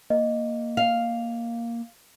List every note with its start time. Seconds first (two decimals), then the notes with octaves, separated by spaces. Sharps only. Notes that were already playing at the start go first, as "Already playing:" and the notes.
0.10 A#3 D#5
0.77 F5